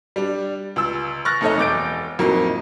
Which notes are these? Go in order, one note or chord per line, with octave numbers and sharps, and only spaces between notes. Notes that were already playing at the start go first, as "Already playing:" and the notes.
G3 D4
C#2 E6
C#6 F6 F#6 A6 A#6
F1 A3 D#4 A4 C#5 D#5
E1 D6 G6 D7
F2 A2 F#3 A#3 D#4